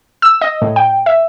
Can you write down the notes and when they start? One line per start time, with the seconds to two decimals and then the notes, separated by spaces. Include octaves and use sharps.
0.22 E6
0.41 D#5
0.62 A2
0.76 G5
1.06 E5